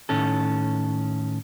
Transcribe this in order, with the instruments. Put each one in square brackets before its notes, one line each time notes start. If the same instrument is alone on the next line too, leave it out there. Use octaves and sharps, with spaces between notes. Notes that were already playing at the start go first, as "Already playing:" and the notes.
[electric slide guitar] A2 D#3 C#4 A4